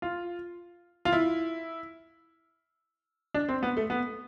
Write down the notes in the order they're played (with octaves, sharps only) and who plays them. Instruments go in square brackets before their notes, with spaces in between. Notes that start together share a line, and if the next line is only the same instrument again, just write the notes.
[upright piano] F4
F4
E4
D4
C4
B3
A3
B3